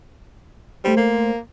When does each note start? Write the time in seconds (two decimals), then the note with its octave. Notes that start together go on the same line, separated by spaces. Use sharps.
0.84 G3 A3 C5
0.97 A#3